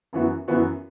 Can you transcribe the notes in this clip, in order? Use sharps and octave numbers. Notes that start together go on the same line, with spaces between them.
F#2 E3 B3 F#4
F#2 E3 B3 F#4